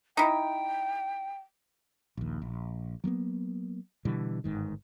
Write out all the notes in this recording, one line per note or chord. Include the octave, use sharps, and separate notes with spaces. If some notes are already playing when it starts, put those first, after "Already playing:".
D#4 E4 G5
A#1 D#2
A#1
F#3 G3 A#3 B3
B2 D3 E3 G3
G1 G#2 D#3